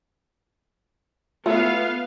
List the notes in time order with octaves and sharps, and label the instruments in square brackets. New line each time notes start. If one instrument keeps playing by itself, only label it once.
[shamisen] A3 E4 [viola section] B3 F5 [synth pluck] F4